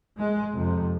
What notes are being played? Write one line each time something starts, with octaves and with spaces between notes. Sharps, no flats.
G#3
F2 C3